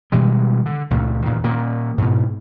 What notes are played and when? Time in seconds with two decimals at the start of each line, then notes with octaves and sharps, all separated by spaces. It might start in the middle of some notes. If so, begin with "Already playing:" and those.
0.12 B2 D#3 G3 G#3
0.66 D3
0.90 C#2 A#2 D#3 A3
1.24 E2 A#2 D#3
1.44 A#2 D#3 A#3
1.98 G#2 B2